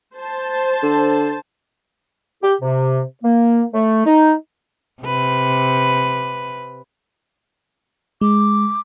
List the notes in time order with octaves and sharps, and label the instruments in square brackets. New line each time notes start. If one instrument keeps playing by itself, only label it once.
[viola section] C5 A5
[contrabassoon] D3
[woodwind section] G4
C3
A#3
A3
D#4
[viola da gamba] C3 B4
[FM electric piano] G#3 [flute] D6